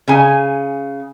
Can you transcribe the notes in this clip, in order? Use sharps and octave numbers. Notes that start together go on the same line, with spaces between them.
C#3 G#5